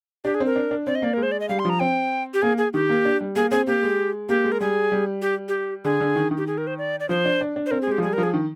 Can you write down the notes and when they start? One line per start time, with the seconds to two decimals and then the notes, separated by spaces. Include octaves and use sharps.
0.24 D4 G4
0.34 G#4
0.40 C4
0.46 A#4
0.56 D4
0.71 D4
0.87 C4 D5
0.95 D#5
1.02 A#3 D5
1.14 G#3 A#4
1.23 C5
1.32 D5
1.40 D#5
1.49 G3 F5
1.59 C6
1.65 F3 A#5
1.80 C4 G5
2.34 G4
2.42 A#3 G#4
2.58 G#4
2.73 D#3 G4
2.89 A#3
3.05 D4
3.21 G3
3.36 A#3 G#4
3.51 C4 G#4
3.67 A#3 G4
3.83 G#3
4.29 A#3 G4
4.44 G#3
4.52 A#4
4.60 G3 G#4
4.92 G3
5.22 G4
5.48 G4
5.85 D3 G#4
6.00 D3
6.16 D#3
6.31 D#3
6.37 G4
6.47 G#4
6.58 A#4
6.67 C5
6.78 D5
7.00 D5
7.09 F3 C5
7.25 D4
7.41 D4
7.56 D4
7.66 C5
7.71 C4 A#4
7.82 G#4
7.87 G#3 G4
7.98 F3
8.03 G3 G#4
8.13 A#4
8.18 F3
8.23 G#4
8.34 D#3